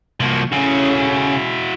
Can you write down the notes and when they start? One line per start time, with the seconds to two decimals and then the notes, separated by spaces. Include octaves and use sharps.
0.20 C2 F3 A#3 F#4
0.52 A2 C#3 C#4 E4 F#4